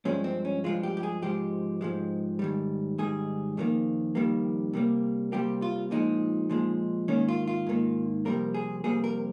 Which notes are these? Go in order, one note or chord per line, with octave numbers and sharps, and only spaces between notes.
G2 F3 G#3 C#4
C4
C#4
G2 F3 G#3 F4
G4
G4
G#4
G#2 F3 G#3 G4
G#2 F3 G#3
G#2 D#3 G3
G#2 D#3 G3 G#4
F2 D#3 G3 A#3
F2 D#3 G3 A#3
C3 G3 A#3
C3 G3 A#3 G4
F4
A#2 F3 G#3 D#4
A#2 F3 G#3
G#2 D#3 A#3 C#4
F4
F4
G#2 D#3 A#3
F2 C3 G3 A#3 A#4
G#4
F2 C3 G3 A#3 G#4
A#4